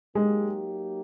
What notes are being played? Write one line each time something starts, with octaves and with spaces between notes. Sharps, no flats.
F#3 G#3 A#3 D#4 G4